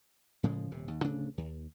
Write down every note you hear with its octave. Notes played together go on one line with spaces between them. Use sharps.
A2 C#3 F3 G#3
D#1 C3
D#2
D1 C#3 A3 D4
D#2